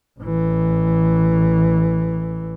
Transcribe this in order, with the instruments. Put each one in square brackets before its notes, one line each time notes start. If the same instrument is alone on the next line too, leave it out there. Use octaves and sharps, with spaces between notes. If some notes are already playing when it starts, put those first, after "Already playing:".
[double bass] A1 E3